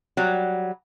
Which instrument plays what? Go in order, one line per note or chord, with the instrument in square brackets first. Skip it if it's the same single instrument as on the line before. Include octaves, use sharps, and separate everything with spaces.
[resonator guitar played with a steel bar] F#3 G3